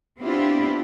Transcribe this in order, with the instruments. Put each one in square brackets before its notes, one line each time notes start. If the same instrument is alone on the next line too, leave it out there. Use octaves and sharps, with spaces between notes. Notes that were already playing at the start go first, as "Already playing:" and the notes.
[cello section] B3 C4 D4 E4 F4 G4